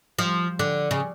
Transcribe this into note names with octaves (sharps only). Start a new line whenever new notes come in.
F3
D3
C#3